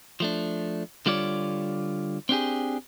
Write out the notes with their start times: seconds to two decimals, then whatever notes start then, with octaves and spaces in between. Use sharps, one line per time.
0.20 F3 A3 D4
1.06 D3 G3 F4 C#5 D5
2.29 C4 D4 G4 G#4